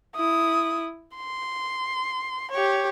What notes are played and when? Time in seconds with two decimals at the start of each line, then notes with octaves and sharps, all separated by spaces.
0.16 E4 D#6
1.16 C6
2.51 G4 C#5